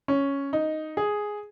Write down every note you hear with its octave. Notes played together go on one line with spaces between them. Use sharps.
C#4
D#4
G#4